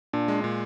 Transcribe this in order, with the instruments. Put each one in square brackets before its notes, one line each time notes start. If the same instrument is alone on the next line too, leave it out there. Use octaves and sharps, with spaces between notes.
[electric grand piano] A#2 [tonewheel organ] D4
[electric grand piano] G#3
A#2